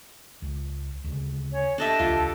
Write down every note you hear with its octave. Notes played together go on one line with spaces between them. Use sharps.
C#2
D2 C#3
C#4 C#5
D4 G4 A4 D#5 E5
D#1 C#2 F4